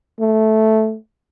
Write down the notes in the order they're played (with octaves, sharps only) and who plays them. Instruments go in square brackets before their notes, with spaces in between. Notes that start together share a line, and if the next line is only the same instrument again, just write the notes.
[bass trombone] A3